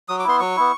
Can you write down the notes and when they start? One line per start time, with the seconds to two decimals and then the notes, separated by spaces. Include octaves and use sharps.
0.09 F#3 D#6
0.19 D6
0.24 B3 E4 C6
0.40 F#3 C#6
0.57 B3 E4